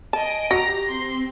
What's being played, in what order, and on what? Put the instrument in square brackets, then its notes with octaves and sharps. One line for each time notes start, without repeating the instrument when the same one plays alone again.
[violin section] D#5 G#5 D7 [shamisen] A5
[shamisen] F#4 [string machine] G4 [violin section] A#5 [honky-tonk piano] A#6
[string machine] C4 [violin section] C6